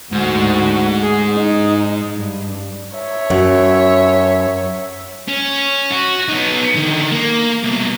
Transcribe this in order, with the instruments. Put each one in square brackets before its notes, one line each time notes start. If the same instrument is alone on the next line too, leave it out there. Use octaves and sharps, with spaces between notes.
[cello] D2 F#4 [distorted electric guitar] G#2
[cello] G#4
D#4
G2
[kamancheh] C#5 E5
[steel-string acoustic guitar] F#2
[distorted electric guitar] C#4
F#4
B3 D#4
D3 D#3
A#3
C2 B2